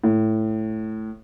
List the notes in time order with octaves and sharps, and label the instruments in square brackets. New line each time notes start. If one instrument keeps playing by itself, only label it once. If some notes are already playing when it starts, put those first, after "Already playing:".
[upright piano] A2